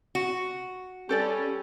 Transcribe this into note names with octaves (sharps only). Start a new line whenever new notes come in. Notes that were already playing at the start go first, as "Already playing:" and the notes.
F#4
G3 C#4 G4 A4 D5